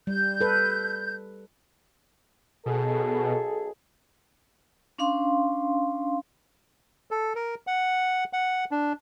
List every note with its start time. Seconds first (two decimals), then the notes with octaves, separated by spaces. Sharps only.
0.07 G3 G6
0.41 A4 B4
2.66 B1 B2 G#4 A4
4.98 C#4 D4 F5 C6
7.11 A4
7.35 A#4
7.67 F#5
8.33 F#5
8.71 D4